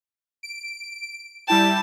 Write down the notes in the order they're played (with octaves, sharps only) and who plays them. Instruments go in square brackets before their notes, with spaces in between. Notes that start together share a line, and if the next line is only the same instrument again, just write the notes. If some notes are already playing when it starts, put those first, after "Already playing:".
[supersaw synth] D7
[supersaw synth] G3 E4 G5 [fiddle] A5